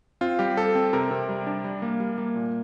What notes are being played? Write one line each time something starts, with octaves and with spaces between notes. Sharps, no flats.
C4 F4
G3 G4
C4 A4
C4
C3 A#4
C3
G3
D4
G3
A#3
G3
A#3
A#2